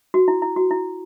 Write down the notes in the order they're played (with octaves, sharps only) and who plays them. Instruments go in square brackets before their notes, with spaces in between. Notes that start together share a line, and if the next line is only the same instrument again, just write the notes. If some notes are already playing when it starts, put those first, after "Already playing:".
[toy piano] F#4
E4
E4
F#4
E4